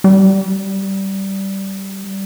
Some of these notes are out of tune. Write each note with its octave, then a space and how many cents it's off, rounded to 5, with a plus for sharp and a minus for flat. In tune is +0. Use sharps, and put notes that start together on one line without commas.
G3 -15